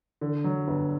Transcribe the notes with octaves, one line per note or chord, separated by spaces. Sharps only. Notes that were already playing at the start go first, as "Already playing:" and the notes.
D3
F#3
G1